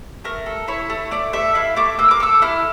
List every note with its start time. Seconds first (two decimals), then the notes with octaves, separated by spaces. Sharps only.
0.24 A3 A#4
0.46 A4
0.68 E4 C#5
0.90 A3
1.11 A3 D5
1.33 A4 E5
1.55 E4 F5
1.76 A3 D6
1.99 A#3 E6
2.11 D6
2.20 A4 E6
2.42 E4 F6